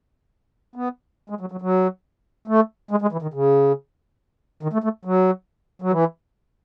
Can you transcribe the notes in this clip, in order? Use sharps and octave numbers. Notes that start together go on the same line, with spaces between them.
B3
G#3
F#3
F#3
F#3
A3
G#3
G#3
E3
D#3
C#3
D#3
A3
A3
F#3
F#3
E3